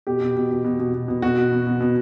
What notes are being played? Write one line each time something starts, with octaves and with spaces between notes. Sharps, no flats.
B2 G4
B2
B2
B2
B2
B2
B2
B2
B2 F#4
B2
B2
B2
B2